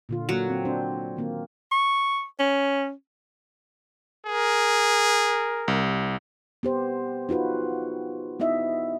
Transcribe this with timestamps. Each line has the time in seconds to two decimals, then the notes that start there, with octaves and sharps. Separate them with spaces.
0.09 A#2 D3 F4
0.29 F#3 A#3 F#5
0.49 C4
0.65 C4 D4 C5
1.17 D#3 A#3 C4
1.72 C#6
2.40 C#4
4.27 G#4 A#4
5.68 C2
6.63 B3 G4 C5
7.29 D#4 F4 F#4 B4
8.40 B3 D#4 E4 D#5 E5